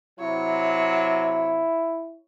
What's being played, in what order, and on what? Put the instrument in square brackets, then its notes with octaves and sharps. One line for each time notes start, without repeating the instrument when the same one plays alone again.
[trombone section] C3 F#3 [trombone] E4 [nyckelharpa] C#5